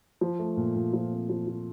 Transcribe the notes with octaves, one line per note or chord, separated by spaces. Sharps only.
F3
A3
A#2
A#2
F3
C4
F3
F3